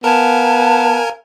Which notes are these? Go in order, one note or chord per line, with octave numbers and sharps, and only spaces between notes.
B3 A#4 F5 G#5 A5